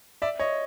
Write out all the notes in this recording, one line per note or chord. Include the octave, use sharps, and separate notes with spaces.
D5 E5
C#5 D#5